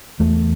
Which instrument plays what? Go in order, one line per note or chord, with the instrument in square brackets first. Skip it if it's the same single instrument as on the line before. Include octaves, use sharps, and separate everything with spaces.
[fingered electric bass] E2 A3